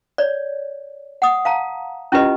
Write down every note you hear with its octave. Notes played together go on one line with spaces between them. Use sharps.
C#5 D5
F#5 D#6
F5 A5 A#5
C#4 E4 F4 G4 B4 D#5